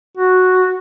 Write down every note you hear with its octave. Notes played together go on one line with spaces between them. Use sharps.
F#4